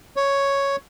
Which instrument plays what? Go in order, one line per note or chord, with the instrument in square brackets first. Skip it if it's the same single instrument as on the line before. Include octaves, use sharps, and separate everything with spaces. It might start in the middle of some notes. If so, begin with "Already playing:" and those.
[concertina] C#5